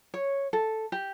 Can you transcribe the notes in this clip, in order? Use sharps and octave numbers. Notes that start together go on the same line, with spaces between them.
C#5
A4
G4